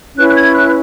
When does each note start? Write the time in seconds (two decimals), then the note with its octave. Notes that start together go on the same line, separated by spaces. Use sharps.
0.16 C#4 E4 B4 F#6
0.29 F#6
0.36 G#6
0.54 F#6